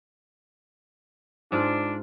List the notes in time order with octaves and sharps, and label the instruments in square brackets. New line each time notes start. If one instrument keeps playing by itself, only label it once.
[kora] G#2 F4 [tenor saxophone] D4